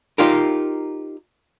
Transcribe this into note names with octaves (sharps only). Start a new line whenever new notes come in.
D#4 F4 G4 A#4